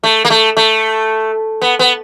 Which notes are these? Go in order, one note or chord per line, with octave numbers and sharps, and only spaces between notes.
A3
A#3
A3
A3
B3
B3